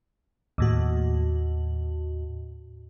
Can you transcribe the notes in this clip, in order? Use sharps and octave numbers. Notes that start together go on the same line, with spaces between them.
D#2 A2 F#4